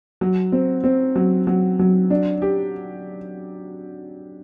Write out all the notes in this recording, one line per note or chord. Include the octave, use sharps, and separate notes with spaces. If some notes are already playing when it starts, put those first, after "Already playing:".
F#3
C4
C4
F#3
F#3
F#3
D4
G4